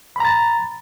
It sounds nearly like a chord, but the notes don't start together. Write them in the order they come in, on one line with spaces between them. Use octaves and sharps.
B5 A#5 A6